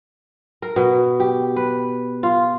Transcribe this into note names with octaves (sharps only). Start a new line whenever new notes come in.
A#4
B2
G4
B4
F4